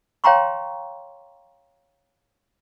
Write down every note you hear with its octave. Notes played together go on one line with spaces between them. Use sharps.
C#5 F5 G5 A#5 C6 C#6